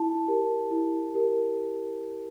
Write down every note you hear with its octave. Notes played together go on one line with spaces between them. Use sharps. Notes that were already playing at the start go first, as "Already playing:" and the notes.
Already playing: E4 A5
G4 A#4
E4
G4 A#4